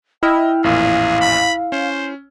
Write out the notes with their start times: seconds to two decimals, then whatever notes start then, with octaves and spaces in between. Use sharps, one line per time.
0.23 E4 D#5 G5 E6 F6
0.64 A1 F2 A#2 G#4 F5
1.21 B5
1.72 C#4 C5